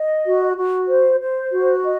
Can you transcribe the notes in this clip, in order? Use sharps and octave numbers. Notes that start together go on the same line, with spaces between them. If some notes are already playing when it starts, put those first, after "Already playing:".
Already playing: D#5
F#4
F#4
C5
C5
F#4
D#5